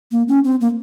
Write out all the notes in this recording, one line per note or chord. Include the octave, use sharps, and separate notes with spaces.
A#3
C#4
C4
A#3